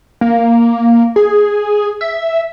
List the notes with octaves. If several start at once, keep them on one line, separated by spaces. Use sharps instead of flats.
A#3
G#4
E5